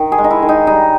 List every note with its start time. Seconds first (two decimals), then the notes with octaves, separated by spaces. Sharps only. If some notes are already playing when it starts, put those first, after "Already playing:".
Already playing: D#3
0.12 G#4
0.18 G#3
0.24 D#4
0.31 E4
0.42 D#3
0.49 D#4
0.67 G3 D#4